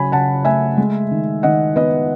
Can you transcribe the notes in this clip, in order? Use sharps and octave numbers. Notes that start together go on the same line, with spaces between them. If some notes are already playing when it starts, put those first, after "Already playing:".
Already playing: C#3 F#3 G#5 B5
C#3 F#5 A5
A3 E5 G#5
G#3
D#3
D#3 D#5 F#5
B3 B4 D#5